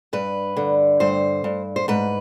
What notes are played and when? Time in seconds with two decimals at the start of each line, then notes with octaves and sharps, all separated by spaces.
0.13 G2 B4
0.57 D3
1.00 G2 C5
1.44 G2
1.76 C5
1.88 G#2 B4